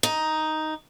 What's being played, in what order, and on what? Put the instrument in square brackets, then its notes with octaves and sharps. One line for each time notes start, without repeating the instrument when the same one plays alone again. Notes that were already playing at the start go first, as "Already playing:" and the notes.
[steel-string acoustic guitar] D#4